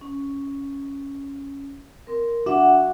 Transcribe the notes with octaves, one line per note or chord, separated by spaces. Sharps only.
C#4
C4 A#4
D4 F#4 E5 F#5